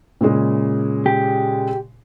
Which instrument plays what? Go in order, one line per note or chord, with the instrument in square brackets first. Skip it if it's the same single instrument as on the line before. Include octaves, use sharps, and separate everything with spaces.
[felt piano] A#2 C#3 G#3
[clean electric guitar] G4